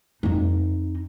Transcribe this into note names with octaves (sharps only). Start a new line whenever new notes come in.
F2 D#4